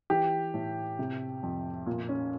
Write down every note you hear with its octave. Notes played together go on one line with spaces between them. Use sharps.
E3 G4
A2
C3
F2
A#2
C#4